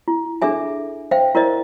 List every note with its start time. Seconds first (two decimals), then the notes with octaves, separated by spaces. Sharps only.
0.08 E4
0.42 D4 G#4 A4 E5 G#5
1.11 C5 E5 F5 G5
1.35 E4 A#4 C5 D5 D#5